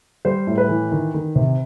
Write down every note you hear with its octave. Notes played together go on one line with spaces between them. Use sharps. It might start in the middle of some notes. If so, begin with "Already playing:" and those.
G3 C5
A2
B4
E3
D#3
D#3
C3